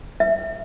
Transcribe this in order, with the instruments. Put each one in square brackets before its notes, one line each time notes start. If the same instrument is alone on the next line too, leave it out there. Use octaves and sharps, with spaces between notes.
[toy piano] E5